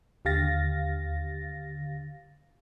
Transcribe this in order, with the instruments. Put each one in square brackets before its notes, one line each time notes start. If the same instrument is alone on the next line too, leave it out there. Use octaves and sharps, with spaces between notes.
[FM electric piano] D#2 D3 G4 F5 A6 A#6